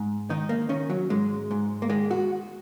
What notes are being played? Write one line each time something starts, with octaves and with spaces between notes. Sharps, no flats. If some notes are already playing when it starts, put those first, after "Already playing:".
Already playing: G#2
D#3 D#4
A#3
D#3 C#4
F#3
G#2 G#3
G#2
A#3
D#3 G#3
F#4